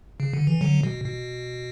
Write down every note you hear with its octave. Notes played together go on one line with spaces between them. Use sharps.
C#3
D3
E3
D3 F#3
B2
B2